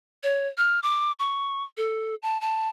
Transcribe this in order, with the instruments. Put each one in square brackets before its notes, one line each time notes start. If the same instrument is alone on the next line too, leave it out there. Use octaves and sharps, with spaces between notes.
[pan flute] C#5
F6
D6
C#6
A4
A5
A5